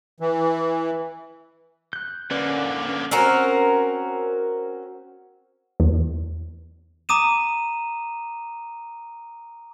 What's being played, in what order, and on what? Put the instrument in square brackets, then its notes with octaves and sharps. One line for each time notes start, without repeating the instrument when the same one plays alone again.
[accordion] E3
[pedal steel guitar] F#6 G6
[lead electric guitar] D3 A#3 [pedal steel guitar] C#4 B4 D5
[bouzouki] C4 C#4 F#4 A#4
[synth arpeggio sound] E2
[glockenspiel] A#5 D6 D#6 D#7 E7